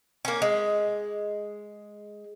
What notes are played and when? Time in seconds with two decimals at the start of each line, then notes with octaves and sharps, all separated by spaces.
0.25 A#3 C#4
0.42 G#3